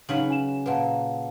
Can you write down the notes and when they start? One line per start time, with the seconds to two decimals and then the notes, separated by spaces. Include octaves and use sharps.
0.09 C#3 F#3 D#4 B4 C#5 F#7
0.30 G#5 E7
0.66 A#2 A#3 B4 F#5 A5